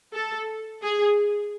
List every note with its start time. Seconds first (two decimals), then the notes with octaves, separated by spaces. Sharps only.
0.14 A4
0.82 G#4